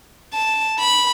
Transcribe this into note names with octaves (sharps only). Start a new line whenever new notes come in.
A5
B5